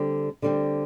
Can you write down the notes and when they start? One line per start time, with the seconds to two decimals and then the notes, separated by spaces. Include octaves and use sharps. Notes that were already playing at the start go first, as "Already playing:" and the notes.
Already playing: D3 G3 C4
0.42 D3 G3 C4